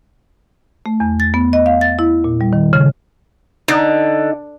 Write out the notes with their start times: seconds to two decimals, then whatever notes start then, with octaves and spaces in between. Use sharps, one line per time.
0.86 A3
1.00 E2
1.20 A6
1.34 B3
1.53 D#5
1.66 F5
1.81 A6
1.99 E4
2.24 A#2
2.41 G3
2.53 D#3
2.73 C#3
3.68 D3 D#4